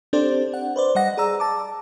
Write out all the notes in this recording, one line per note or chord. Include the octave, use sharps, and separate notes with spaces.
C4 D4 G4 A4 C5 D5
F#5
B4 C5 D5
G3 D#5 F#5 A#6
G#4 D5 A#5 E6
A5 D6